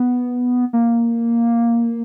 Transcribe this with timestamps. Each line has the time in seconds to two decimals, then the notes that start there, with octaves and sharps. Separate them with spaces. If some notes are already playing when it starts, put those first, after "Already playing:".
Already playing: B3
0.73 A#3